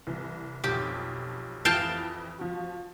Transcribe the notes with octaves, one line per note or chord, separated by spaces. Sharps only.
C2 E3
B1 F2 G4
F2 E3 F5 G5 A5
F3 F#4